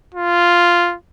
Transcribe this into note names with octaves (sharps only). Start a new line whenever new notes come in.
F4